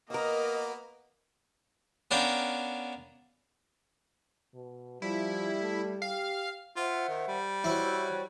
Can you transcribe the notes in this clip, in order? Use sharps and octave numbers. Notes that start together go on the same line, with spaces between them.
A#3 B3 F#4 A#4 D#5
B3 C#4 D4 A#4 F5 G5
B2
F3 G3 E4
A3
G4 F5
F4 C5 E5 F#5
D#3
G3
E4 F#4 C5 C#5